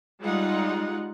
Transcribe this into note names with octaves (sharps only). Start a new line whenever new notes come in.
G3 G#3 D#4 F4 F#5